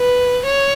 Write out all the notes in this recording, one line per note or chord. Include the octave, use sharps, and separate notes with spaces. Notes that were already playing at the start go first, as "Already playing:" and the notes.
Already playing: B4
C#5